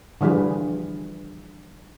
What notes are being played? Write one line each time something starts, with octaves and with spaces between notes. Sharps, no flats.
D3 E3 F3 G3 G#4